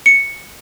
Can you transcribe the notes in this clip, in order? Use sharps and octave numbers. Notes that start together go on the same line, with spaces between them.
C#7